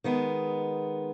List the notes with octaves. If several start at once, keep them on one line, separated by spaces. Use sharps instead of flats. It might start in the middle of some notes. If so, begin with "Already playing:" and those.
D#3 G#3 B3